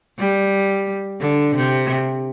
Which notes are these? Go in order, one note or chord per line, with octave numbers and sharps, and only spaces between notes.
G3
D3
C3